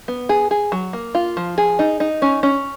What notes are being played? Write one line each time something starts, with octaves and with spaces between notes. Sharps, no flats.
B3
G#4
G#4
F#3
A#3
F4
F3
G#4
D#4
D#4
C#4
C#4